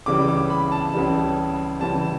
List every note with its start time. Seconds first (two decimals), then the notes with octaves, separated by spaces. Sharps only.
0.06 C#2 C#3 E3 G3 D6
0.28 D6
0.50 B5
0.72 A5
0.94 C#2 C#3 E3 G3
1.80 C#2 C#3 E3 G3 A5